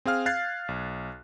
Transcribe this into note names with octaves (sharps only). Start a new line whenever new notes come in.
C4 G#4 F5 F6
F5 F#6 G#6 A6 C7
B1